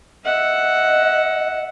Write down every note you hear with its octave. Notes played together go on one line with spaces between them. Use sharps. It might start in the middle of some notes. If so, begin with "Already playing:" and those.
D#5 E5 F#5